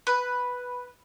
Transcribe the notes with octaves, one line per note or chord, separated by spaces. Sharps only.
B4